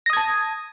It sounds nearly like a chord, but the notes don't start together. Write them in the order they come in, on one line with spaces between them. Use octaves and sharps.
A#6 D#6 G#6 A5